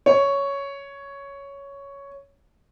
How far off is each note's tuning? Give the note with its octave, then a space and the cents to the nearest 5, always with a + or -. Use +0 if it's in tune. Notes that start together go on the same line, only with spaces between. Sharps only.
C#5 +5